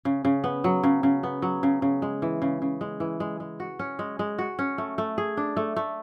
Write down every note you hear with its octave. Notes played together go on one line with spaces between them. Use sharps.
C#3
C#3
B3
F#3
C#3
C#3
B3
F#3
C#3
C#3
G#3
E3
C#3
C#3
G#3
E3
G#3
G#3
F#4
C#4
G#3
G#3
F#4
C#4
A3
A3
G#4
D4
A3
A3